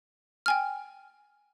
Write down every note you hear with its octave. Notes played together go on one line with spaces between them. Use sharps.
G5 G#5 F6